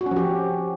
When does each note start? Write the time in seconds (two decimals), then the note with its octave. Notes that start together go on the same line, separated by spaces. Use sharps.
0.01 F#4
0.06 C#4
0.11 F3
0.16 G4